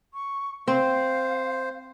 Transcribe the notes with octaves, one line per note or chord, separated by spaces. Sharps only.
C#6
C4 C5 F5